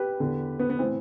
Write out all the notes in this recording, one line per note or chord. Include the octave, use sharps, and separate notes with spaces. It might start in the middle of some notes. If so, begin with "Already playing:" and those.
Already playing: G4 B4
E2 D3
B3
B3
A2 E3 C4